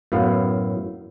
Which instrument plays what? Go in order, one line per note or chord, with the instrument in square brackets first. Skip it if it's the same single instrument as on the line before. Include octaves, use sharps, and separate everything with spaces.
[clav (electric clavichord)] F#2 A2 B3 F5